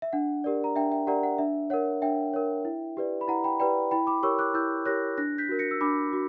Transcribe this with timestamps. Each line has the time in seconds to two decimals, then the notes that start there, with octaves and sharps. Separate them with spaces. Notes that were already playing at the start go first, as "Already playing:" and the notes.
0.02 E5
0.13 D4 F#5
0.44 G4 A#4 D5
0.64 A#5
0.76 D4 E5 G5
0.92 E5 G5
1.07 G4 A#4 D5 F#5 A#5
1.23 F#5
1.38 D4 E5
1.70 A#4 C#5 F#5
2.02 D4 E5 G5
2.34 A#4 C#5
2.65 E4
2.97 G4 B4 D5
3.21 B5
3.28 E4 F#5 A#5
3.44 G5 B5
3.59 G4 B4 D5 G5 B5
3.91 E4 G5 B5
4.07 B5 D6
4.23 G4 A#4 C#5 C#6 E6
4.39 D6 F#6
4.54 E4 E6 G6
4.86 G4 A#4 C#5 F#6 A#6
5.17 D4 F#6 A#6
5.38 G6 B6
5.49 F#4 A#4
5.59 A#6 C#7
5.71 E6
5.81 D4 B5 D6
6.13 F#4